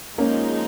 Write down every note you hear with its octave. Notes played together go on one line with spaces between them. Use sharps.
F3 G#3 A#3 C#4 D#4